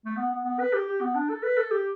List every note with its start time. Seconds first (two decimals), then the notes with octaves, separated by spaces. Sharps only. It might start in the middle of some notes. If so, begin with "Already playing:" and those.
0.05 A3
0.16 B3
0.31 B3
0.45 B3
0.59 B4
0.73 G4
0.87 G4
1.01 B3
1.15 D4
1.29 A4
1.43 B4
1.57 A4
1.71 G4